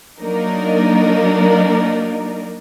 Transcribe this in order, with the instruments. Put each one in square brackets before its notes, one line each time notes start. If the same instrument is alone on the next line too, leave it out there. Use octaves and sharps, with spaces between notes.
[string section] F#3 A#3 D4 D#4 A#4